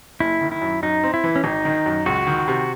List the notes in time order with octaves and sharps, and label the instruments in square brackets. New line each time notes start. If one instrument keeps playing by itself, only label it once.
[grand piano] F#1 [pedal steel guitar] E4
[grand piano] D#3
[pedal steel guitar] E4
[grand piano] F#2
[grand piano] F#2 [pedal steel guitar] D#4
[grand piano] C4
[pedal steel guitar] E4
[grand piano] E3
[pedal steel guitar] C#4
[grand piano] G#1 [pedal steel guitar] D#4
[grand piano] D#3
F#2
[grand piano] C#2 [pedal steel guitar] F#4
[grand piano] D#3
C3